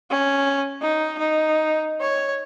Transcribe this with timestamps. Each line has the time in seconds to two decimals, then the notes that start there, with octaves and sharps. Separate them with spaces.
0.10 C#4
0.82 D#4
1.18 D#4
2.00 C#5